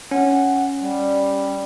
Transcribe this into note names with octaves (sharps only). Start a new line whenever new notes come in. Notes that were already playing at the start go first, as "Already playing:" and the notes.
C#4 F#5
G3